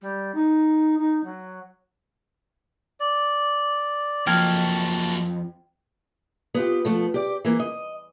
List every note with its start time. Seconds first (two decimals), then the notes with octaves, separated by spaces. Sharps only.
0.01 G3
0.34 D#4
0.98 D#4
1.24 F#3
3.00 D5
4.27 F2 F#3 A#3 G5 A5 F6 G#6
6.54 B3 F4 G4
6.85 F3 A3 B3
7.14 G4 D5
7.45 E3 A#3
7.60 D#5